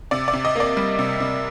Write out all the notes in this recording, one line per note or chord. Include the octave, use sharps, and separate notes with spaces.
C3 D5
D5
C3
D#5
A#3 D5
G3
C3
C3